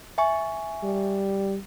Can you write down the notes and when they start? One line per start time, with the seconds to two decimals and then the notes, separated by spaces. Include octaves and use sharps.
0.18 E5 G#5 C#6
0.83 G3